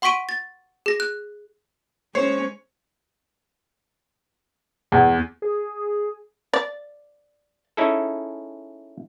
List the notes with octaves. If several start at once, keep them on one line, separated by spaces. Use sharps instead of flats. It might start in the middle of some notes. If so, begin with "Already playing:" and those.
F#5 C6 C#6 B6 D7 D#7
A6
G#4 A#6
F#6
G#3 C#4 C5 C#5
E2
G#4
D5
C#4 D#4 E4 G#4 A4